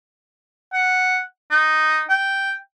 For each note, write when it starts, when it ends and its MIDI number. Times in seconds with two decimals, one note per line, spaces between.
0.73 1.20 78
1.51 2.02 63
2.09 2.53 79